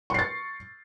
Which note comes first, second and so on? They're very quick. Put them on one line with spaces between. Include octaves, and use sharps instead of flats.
C#6 C7 A6